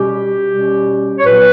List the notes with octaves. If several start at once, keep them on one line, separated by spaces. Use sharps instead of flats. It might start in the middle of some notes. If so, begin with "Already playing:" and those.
Already playing: B2 G3 C#4 G4
B2 G3 C#4
C#5
A#2 F#3 B3 B4